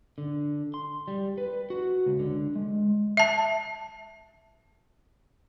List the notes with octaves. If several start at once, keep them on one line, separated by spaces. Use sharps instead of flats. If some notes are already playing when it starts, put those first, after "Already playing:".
D3
C6
G3
B4
F#4
C#2
D3
G#3
E5 A5